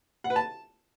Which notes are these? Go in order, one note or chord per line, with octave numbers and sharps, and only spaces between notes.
F#5
B4
A5